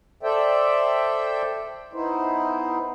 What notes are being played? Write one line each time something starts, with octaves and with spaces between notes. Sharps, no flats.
A4 C5 D5 E5 G5
B3 D#4 E4 C5